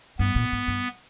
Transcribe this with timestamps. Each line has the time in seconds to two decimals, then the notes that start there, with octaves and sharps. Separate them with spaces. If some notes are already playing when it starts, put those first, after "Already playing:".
0.19 G2 B3
0.36 A#2
0.52 G#2
0.68 G2